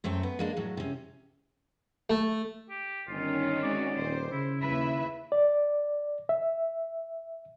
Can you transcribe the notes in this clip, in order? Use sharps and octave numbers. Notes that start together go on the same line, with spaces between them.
F#2 A3 C4 C#5 G5
B3
G#3 A#3 D4
A2 F#3
C3 C#4
A3
G4
G1 D#3 C#4 F4
G#3 C4 F#4 D5
D#1 C5
C#3 E4
D#2 E4 B4 E5 B5
D5
E5